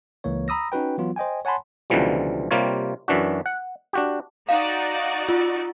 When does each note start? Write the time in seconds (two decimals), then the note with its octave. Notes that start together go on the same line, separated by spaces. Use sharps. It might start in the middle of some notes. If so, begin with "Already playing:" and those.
0.24 C#2 E3 A#3 C#5
0.48 A#5 B5 D#6 E6 A#6
0.72 C#4 D#4 F#4 B4 G5
0.98 E3 F#3 B3 F4
1.16 C5 D#5 G5 G#5
1.45 C#5 F#5 G#5 A5 B5 C6
1.90 C#2 B2 D3 E3 F3 G3
2.51 C3 G3 A#3 F4 C#5
3.08 F#2 E3 D4 F#4
3.46 F#5
3.93 D4 F#4 G4
4.49 D#4 F#4 D5 F5
5.29 F4